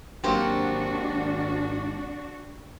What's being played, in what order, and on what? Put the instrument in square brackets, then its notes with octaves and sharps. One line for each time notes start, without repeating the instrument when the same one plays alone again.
[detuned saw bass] G#1 [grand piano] F#3 A#3 C4 [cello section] D4 F#4 [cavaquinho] G4 C5